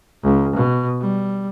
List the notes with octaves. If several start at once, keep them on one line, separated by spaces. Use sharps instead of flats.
C#2
B2
G3